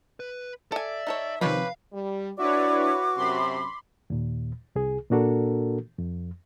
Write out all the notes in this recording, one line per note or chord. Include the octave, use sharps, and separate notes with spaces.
B4
A4 D5 E5 G#5
D#4 A4 C#5
C3 D#3 F3 C#4 G4 B4 F5 B5
G3
D4 E4 F#4 B4 C#5 D5 D6
F#2 C3 B5 C6
D#2 A#2
C2 G#4
A#2 A#3 D4 F#4 A4 A#4
F2